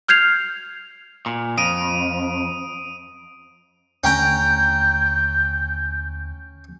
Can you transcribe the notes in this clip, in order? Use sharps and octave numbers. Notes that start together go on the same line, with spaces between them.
F6 G6 G#6 C7 F7
A#2
F2 D#6 D7 D#7
D#2 D3 A3 C#4 G5 A#5 G6